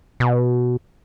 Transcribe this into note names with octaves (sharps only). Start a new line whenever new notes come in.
B2